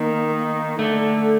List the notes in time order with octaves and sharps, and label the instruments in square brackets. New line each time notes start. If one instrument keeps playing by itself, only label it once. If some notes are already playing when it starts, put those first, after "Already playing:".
Already playing: [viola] D#3 [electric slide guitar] A#3
[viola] D3 [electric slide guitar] A3